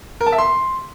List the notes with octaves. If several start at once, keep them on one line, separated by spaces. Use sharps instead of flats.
A#4
A5
E5
C6